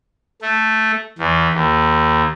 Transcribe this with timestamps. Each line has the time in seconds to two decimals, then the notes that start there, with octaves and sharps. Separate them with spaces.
0.42 A3
1.18 E2
1.53 D#2